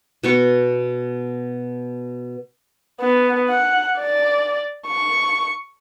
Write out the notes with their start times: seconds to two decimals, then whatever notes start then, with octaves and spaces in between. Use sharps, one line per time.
0.23 B2 B3 C#6
3.01 B3
3.49 F#5
3.98 D5
4.87 C#6